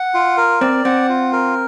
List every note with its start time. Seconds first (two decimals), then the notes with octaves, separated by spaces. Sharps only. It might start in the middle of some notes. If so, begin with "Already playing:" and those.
Already playing: F#5
0.14 F4
0.37 A#4
0.61 C4 D5
0.85 C4 F#5
1.09 F4
1.32 A#4